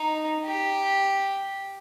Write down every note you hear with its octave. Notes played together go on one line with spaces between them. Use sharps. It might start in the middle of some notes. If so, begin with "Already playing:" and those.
Already playing: D#4
G4